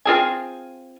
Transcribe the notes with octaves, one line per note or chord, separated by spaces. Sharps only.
C4 F4 G#4 G#5